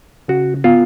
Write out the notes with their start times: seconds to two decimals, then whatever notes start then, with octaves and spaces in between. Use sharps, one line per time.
0.28 C#3 F#4
0.64 B3 F4